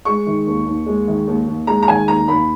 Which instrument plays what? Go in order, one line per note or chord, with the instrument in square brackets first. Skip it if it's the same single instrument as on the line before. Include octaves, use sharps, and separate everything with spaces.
[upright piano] G#3 C#6
D#3
D#2
D#2
G#3
D#3
D#2
D#2
G#3 A#5
A#5
D#3 G#5
D#2 A#5
D#2 B5